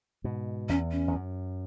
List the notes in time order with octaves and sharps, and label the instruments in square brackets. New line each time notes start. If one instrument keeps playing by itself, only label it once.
[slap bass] G#2 B2
[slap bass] E2 [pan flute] C#4
[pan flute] C#4
[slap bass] E2
F#2